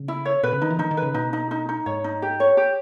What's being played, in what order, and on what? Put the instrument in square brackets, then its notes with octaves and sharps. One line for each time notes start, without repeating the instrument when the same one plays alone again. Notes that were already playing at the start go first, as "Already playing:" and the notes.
Already playing: [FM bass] C#3
[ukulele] E4
C#5
[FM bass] B2 [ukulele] B4
[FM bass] C#3
[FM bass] D#3 [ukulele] D#4
[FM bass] E3
[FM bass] D#3 [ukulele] D#4
[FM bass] D#3
[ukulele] B4
[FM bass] C#3
[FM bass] B2 [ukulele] D#4
[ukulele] D#4
D#4
D#4
[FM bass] G#2 [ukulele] C#5
[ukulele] D#4
G4
C#5
G4